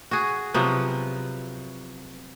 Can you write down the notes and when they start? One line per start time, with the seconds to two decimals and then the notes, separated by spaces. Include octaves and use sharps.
0.11 F#4 G#4
0.54 C3 F3 F#3 B3